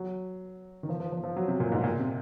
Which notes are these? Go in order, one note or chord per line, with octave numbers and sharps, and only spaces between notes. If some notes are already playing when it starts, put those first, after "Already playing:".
Already playing: F#3
D#3
F3
F3
F3
F3
F#3
C3
A#2
G#2
A#2
C3